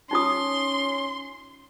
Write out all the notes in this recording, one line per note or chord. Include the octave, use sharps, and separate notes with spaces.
C#4 D#4 F4 C6 D#6